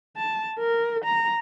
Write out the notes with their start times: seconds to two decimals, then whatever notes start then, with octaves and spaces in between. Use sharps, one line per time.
0.17 A5
0.59 A#4
1.05 A#5